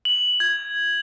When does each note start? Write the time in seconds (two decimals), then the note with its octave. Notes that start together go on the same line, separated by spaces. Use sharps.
0.05 F#7
0.40 G#6